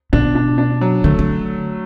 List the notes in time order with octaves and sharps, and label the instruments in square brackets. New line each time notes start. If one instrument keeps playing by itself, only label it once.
[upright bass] B2 [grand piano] D4
[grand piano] D4
D4
F#3
[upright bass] D3 [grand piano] A3
[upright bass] D3